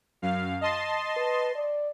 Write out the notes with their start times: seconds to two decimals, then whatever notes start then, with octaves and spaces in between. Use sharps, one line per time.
0.22 F#2 F5
0.61 D#5 A5 C6
1.17 B4
1.55 D5